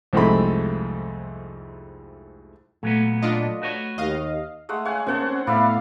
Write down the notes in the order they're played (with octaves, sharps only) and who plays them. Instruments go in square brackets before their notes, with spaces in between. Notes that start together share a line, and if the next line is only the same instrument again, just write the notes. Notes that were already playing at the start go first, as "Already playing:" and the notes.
[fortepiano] C2 F2 G#2 A3 C4 B5
[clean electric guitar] A#2 F#3 B3 [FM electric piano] A3
[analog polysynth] D4 F4 D#5
[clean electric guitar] F#4 B4 C#5
[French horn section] D#2 [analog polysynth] D#5 F5
[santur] G#3 A3 F#5
[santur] C#5 F#5 [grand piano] F5 G#5
[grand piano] A#3 [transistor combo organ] C#4 C5 [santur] C#5 F#5 A5
[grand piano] C4
[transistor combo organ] A2 F5 [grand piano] B3 [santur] D5 E5 [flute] B5